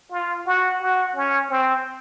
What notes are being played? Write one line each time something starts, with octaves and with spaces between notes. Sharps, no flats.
F4
F#4
F#4
C#4
C4